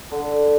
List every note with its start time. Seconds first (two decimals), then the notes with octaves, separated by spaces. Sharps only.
0.12 D3